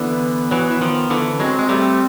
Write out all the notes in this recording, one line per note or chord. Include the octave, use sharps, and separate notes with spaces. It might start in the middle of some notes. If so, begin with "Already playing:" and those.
Already playing: D3 E3 B3
E3 F#3
E3
D#3 F3
D3 E3
C#4
F#3 G#3 C4
G#3
G3 A3